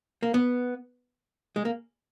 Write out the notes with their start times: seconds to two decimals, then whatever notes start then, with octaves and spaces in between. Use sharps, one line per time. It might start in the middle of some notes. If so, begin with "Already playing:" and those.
0.23 A#3
0.34 B3
1.56 G#3
1.65 A#3